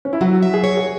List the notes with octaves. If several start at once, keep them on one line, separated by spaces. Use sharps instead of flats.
C#4
E4
F#3 F#4
E5
G#4
C#5
G#4